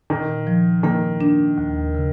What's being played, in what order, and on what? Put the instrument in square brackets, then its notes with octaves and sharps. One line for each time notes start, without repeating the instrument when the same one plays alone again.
[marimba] A#2 [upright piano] D#3
[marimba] F3
[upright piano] D#3 [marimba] A#3
[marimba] D4
D#2
C#3